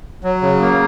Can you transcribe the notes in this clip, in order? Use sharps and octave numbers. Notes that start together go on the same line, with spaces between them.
F#3
C#3
A#3